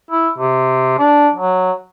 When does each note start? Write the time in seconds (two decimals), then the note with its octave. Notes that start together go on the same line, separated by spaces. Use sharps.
0.11 E4
0.38 C3
0.99 D4
1.34 F#3